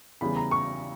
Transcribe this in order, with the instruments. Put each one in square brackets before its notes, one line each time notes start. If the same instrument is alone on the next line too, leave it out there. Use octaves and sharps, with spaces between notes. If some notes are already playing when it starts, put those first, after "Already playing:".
[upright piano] E2 C#3 E3 G3 [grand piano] B5
[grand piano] A#5
C#6